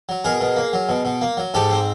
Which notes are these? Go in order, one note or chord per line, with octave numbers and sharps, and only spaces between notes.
F#3
B2 G#4 A#4
B2
A#3
F#3
B2
B2
A#3
F#3
G#2 G4 A4
C4